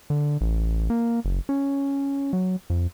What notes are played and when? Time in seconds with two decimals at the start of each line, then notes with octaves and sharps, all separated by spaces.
0.10 D3
0.41 A1
0.90 A#3
1.25 F#1
1.49 C#4
2.33 F#3
2.70 F2